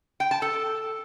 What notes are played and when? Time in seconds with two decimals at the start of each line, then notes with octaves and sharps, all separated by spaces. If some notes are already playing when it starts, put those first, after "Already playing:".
0.20 G5
0.31 A5
0.42 A4